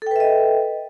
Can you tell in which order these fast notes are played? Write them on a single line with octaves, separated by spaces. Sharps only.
A4 G5 B4 E5 D#5